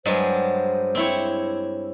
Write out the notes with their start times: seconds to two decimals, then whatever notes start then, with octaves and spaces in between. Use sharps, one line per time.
0.06 G2 F#3 G#3 C5
0.95 C4 E4 C#5